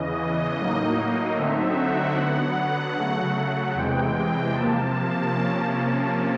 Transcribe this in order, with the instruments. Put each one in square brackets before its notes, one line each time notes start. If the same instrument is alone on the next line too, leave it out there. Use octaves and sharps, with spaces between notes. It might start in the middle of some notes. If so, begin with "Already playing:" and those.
Already playing: [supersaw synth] E2 C#3 E3 D#5
A2 F#3 A#3 D#4
D3 F#3 A3 C4 D#4 E5
F#5
D3 F#3 B3 F#5
C#3 F#3 A3
E2 C3 E3 G#3 G5
C3 F3 A#3 A5
C3 F3 A#3 C#4